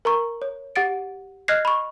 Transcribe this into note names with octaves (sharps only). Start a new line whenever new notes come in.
A#4 A#5 C#6
C#5
G4 F#5 A6 D7
D#5 F6 F#6 G#6 A#6 C7
B5 C#6